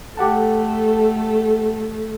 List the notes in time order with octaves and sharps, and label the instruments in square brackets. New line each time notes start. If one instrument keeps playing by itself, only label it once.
[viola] A3 A4 [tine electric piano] G4 F#5 A5